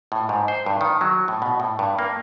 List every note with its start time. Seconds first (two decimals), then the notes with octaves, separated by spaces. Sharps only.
0.12 A2
0.29 G#2
0.48 C5
0.66 G2
0.81 D#3
1.01 F#3
1.28 A2
1.42 B2
1.60 A2
1.79 G2
1.99 A#3